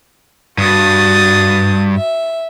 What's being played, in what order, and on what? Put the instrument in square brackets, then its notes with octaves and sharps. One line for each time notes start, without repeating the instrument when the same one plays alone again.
[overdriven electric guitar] G2 [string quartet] F#4 D#6 A6
[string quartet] E5